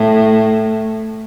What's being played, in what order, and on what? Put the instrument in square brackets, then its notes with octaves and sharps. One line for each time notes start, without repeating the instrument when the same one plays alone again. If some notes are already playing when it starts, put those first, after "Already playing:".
Already playing: [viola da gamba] A2